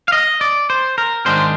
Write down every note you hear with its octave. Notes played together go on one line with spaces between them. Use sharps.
F5
D#5
D5
C5
A#4
G#2 D#3 G#3 D4 C5